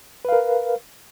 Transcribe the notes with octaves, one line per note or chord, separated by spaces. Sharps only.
A#4 B4 F5